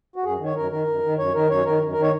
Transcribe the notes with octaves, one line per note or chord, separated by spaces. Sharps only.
F#4
F#2 G#4
D#3
C#5
F#2 A#4
D#3 A#4
F#2
D#3
F#2 C#5
D#3 A#4
F#2 C#5
D#3 A#4
F#2
A#4
D#3
C#5